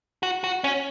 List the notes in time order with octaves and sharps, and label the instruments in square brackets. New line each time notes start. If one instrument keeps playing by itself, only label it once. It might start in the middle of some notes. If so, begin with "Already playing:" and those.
[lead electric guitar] F#4
F#4
C#4